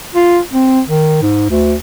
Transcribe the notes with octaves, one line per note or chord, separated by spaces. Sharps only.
F4
C4
D#3
G#2
D2